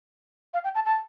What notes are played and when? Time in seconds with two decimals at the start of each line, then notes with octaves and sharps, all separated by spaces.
0.54 F5
0.64 G5
0.75 A5
0.86 A5